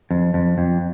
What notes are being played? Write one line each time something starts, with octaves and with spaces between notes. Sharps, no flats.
F2
F2
F2